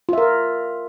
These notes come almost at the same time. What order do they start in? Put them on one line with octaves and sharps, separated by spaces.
F4 E5 A#4